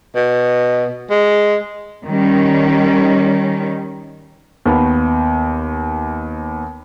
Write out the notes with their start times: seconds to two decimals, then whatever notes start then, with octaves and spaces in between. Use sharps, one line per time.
0.15 B2
1.10 G#3
2.06 D#3 G3 C#4
4.66 D#2 B3